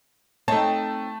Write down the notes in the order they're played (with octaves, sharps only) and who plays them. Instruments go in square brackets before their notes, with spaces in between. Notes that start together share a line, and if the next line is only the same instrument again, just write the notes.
[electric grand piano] A3 A5 [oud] C4 D#4 C#5